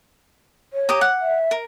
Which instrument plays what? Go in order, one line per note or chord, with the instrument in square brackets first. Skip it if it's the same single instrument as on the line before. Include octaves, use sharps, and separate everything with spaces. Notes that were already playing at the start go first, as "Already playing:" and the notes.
[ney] C#5
[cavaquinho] G4 A#5 D#6
F#5
[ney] E5
[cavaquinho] A#4